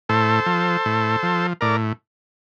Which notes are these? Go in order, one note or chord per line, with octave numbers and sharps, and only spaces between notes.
A2 A4 C5
F3
A2
F3
A2 A#4 D5